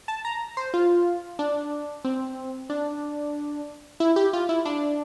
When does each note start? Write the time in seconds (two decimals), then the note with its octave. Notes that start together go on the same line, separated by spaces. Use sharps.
0.08 A5
0.25 A#5
0.57 C5
0.74 F4
1.39 D4
2.05 C4
2.70 D4
4.00 E4
4.16 G4
4.33 F4
4.49 E4
4.65 D4